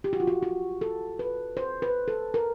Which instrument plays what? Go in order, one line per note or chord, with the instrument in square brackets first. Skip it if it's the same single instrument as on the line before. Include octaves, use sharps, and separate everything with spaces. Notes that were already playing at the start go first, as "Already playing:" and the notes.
[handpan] G4
F#4
F4
F#4
F#4
A4
B4
C5
B4
A4
A#4